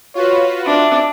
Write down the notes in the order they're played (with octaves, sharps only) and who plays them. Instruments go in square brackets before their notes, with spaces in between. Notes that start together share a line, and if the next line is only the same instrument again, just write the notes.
[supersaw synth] F4 F#4 B4 [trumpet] C#5
[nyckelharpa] D4 [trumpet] E5